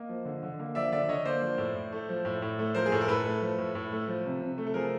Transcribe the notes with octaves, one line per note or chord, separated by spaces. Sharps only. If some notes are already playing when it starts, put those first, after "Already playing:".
Already playing: A#3 D#5
F3
D3
D3
A#3
F3 D5 E5
D3 D5 E5
D3 C#5 D#5
A#3 C5 D5
F3
A2
A2
A3
F3
A2
A2
A3
F3 A#4 C5
G#4
A2 A4
A#4
A2 A4 B4
A3
F3
A2
A2
A3
F3
C3
C3
A3
A4
F3 G#4 A#4